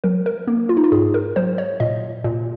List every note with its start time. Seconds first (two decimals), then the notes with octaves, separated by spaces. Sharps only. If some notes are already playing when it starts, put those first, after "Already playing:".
0.04 F#3 A#4
0.26 A#4
0.47 A#3
0.69 F4
0.77 D#4
0.84 F4
0.92 G#2 G#4
1.14 A#4
1.36 F#3 C5
1.58 C#5
1.80 A#2 D#5
2.24 A#2